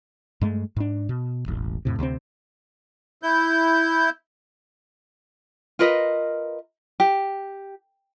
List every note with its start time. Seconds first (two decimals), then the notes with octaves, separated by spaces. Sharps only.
0.41 G2 G#3 A3
0.76 G#2 D4
1.09 B2
1.46 E1 A1
1.85 F2 A2 C3
1.99 D2 C3 G3 C4
3.23 E4 G6
5.79 F4 A#4 B4 D#5
7.00 G4